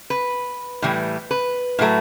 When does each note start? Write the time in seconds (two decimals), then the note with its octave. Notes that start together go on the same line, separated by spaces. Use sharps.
0.10 B4
0.82 A2 E3 G3
1.31 B4
1.79 A2 F#3 A3